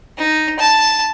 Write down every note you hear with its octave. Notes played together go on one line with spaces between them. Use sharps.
D#4
A5